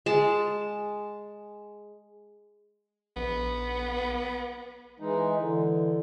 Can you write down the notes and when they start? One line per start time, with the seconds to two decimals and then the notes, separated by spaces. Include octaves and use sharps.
0.06 G#3 A5
3.16 A#1 B3
5.00 E3 G#3 D#4
5.37 D3 E3